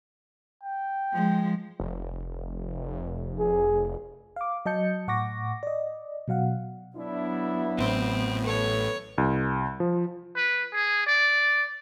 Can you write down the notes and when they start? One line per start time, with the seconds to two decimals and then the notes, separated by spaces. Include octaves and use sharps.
0.64 G5
1.13 F3 G#3
1.80 F1
3.39 G#4
4.36 F5 D6
4.66 F#3 D#5 A5 G6 C#7
5.08 A2 F#5 C#6 D6 A#6
5.63 D5 D#5
6.28 B2 F#3 F5 F#5
6.96 F#3 B3 D4 E4
7.78 A1 A2 C4
8.45 A4 B4 C#5
9.18 C2
9.80 F3
10.36 B4
10.73 G#4
11.07 D5